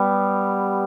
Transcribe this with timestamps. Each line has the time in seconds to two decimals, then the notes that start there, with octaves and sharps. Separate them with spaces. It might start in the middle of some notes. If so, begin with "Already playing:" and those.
Already playing: G3 B3